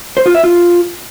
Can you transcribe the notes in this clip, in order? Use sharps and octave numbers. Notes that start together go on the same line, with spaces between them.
C5
F4
E5
F4